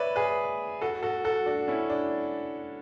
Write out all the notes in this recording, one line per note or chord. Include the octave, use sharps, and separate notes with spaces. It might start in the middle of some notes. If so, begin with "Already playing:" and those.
Already playing: B4 C#5 D5 E5
G#4 B4
F#4 A4
F#4 A4
F#4 A4
D4 F#4
C#4 E4
D4